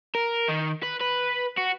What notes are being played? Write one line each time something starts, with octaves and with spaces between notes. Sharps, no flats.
A#4
D#3
B4
B4
F#4